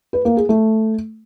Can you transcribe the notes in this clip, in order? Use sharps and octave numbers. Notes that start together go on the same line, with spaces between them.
B4
A#3
G#4
A3